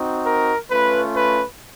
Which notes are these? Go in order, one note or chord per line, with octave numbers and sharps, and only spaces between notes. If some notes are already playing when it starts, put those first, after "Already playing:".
Already playing: C4 D#4 F#4
A#4
A3 C#4 F4 B4
B4